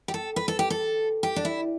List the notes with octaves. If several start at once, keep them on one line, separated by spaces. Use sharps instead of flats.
G4
A4
B4
A4
G4
A4
G4
D4
E4